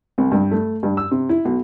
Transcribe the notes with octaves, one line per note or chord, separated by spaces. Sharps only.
C2
G2
A3
G2
E6
C3
E4
B1